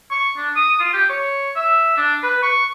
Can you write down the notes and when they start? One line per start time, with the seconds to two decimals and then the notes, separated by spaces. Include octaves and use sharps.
0.11 C#6
0.37 D4
0.56 D#6
0.80 F4
0.93 G4
1.09 C#5
1.56 E5
1.97 D4
2.23 B4
2.43 C#6